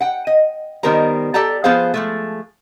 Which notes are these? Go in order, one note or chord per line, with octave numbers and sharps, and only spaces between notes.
F#5 G5
D#5
D#3 G3 B3 A#4 C5 A#5
G4 A4 D5 A5 A#5
F3 B3 G#4 C5 F5
F3 G#3 A3